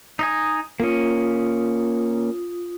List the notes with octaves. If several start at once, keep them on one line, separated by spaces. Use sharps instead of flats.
D#4 D#5 G#5
A#3 C#4 F4 D#6